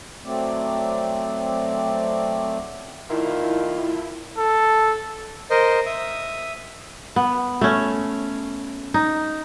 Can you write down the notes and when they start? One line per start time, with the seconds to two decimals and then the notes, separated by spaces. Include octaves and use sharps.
0.24 F#3 A3 C4 D5
3.10 D#3 A3 D4 E4 F4
4.38 A4
5.50 A#4 C5 D#5
5.86 E5 D#6
7.16 B3
7.61 A3 C#4
8.94 D#4